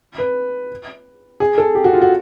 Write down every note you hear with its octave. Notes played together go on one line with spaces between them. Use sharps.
B4
G#4
A4
G4
F#4
F4
F#4